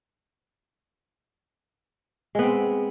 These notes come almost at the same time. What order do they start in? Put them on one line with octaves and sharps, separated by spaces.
G#3 B3 C4